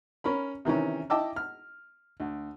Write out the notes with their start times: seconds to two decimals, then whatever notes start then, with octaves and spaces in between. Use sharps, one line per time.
0.24 C#4 A#4 B5
0.65 C3 D#3 E3 C#4
1.10 E4 D#5 G5 A5 D6 E6
1.36 F6
2.20 D2